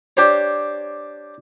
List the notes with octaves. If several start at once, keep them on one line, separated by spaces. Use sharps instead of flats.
D4 G4 C5 C#5